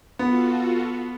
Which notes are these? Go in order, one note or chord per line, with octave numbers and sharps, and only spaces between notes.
B3 F4 F#4 A4